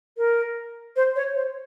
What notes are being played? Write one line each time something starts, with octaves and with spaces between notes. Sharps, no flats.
A#4
C5
C#5
C5